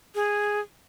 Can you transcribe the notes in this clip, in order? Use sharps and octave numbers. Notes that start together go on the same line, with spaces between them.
G#4